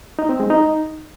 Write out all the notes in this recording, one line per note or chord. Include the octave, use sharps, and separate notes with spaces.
D#4
C4
G#3
D#4